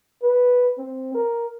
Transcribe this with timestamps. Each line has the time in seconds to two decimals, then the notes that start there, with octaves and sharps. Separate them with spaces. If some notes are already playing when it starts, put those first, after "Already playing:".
0.22 B4
0.78 C4
1.15 A#4